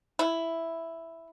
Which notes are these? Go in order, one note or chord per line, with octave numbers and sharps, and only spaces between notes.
E4